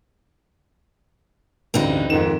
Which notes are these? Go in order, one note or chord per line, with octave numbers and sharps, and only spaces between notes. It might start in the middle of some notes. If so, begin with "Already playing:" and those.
A1 D2 G2 C4 D#4
F2 G#2 D#3 E7